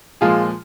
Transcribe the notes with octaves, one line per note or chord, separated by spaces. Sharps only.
A#2 F3 G#3 F4 G#4